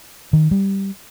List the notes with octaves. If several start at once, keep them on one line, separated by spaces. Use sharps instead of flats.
D#3
G3